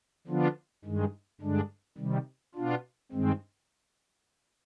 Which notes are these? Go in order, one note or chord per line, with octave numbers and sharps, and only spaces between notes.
D3 F3 B3 D4 F4
G2 D#3 G#3
G2 D3 G#3 D4
C3 D#3 G3
B2 B3 D4 F4
G2 D#3 G#3 C4